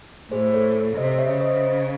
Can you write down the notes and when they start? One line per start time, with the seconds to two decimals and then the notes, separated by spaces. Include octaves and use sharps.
0.31 A2 G#4 C5
0.54 A4 C#5
0.97 C3 C5 D#5
1.18 C#5 E5
1.30 C#3
1.40 C5 D#5